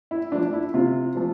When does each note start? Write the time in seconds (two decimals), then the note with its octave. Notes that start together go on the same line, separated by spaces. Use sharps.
0.11 E4
0.32 F3 D4
0.35 A3
0.53 E4
0.74 C3 F4
1.15 F3 A3